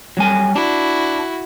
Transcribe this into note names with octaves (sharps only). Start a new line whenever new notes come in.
F#3 G3 G#5
D4 E4 F#4